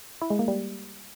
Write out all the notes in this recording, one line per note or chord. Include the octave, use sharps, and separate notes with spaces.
E4
G#3
A#3
G3